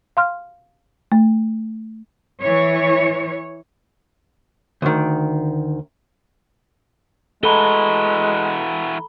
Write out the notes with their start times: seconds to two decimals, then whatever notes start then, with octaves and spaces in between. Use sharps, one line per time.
0.17 F5 C6 F6
1.12 A3
2.41 E3 C#5
4.82 D2 D#3
7.43 E3 G#3 F#4 A4 A#5 B5 G7